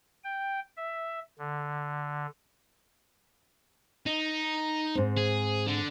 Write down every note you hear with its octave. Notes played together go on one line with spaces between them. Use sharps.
G5
E5
D3
D#4
G#2 C4
G#4
D3